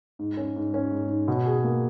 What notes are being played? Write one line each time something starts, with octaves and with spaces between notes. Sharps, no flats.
G#2
C#4
G#2
C#4
G#2
G#2
B2
G#4
A#3